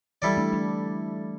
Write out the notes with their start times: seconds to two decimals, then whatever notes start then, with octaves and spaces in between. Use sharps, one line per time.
0.22 E3 G3 E4 A4 D5
0.37 A3 D4
0.52 A3 D4